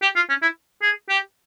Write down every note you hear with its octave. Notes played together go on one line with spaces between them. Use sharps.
G4
F4
C#4
E4
G#4
G4